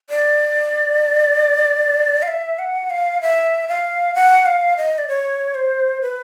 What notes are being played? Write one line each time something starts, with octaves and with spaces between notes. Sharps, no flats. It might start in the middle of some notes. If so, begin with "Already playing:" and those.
D5
F5
E5
F#5
F5
E5
F5
F#5
F5
D#5
D5
C#5
C5
B4